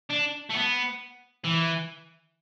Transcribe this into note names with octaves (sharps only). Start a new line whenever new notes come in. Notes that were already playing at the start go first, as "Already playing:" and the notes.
D4
A3
B3
E3